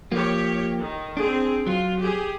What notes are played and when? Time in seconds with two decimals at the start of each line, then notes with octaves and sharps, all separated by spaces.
0.12 F3 A#3 F4 G4 C#5
0.79 D#3
1.17 C4 D4 G#4
1.67 F#3 F4
2.00 G4 G#4